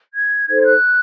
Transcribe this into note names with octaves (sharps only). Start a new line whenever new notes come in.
G#6
D#4 A4 C5 G#6
G#6
F#6